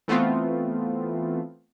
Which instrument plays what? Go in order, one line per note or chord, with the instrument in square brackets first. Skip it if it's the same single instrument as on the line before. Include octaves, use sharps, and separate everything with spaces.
[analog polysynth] E3 A3 B3 C4 F4